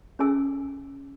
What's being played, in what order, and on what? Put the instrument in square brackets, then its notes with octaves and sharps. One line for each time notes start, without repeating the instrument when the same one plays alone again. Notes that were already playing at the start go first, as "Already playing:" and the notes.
[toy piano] C#4 G#4 A4 G#5 E6